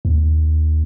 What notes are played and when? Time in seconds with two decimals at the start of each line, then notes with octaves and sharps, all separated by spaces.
0.05 D#2